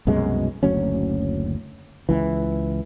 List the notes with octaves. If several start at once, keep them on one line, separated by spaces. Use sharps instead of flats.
C2 F#2 B2 G#3
F#1 D2 F#3 C#4
C#2 E3